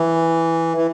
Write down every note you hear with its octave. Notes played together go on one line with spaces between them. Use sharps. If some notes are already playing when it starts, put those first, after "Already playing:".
Already playing: E3
E3